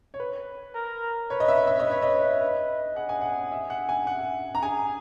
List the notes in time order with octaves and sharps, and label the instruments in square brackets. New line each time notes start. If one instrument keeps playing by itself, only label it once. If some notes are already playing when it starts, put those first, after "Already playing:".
[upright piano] C#5
B4
[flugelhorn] A#4
[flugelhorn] B4 [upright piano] C#5
[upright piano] D#5
E5
E5
D#5
[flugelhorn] B4 [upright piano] C#5
[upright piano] D#5
[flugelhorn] B4
[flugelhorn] G#4 [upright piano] F#5
[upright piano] G#5
F#5
E5
F#5
G#5
F#5
A#5
[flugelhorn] G#4 [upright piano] G#5